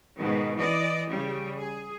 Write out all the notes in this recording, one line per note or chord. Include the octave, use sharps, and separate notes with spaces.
G#2 B2 D#3
E3 D5 D#5
C#3 G3
G#4